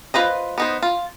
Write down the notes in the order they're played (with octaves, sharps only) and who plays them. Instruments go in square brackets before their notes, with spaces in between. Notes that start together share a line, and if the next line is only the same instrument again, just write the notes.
[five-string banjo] F4 B4 C5 D#5
B3 D#4 C5
F4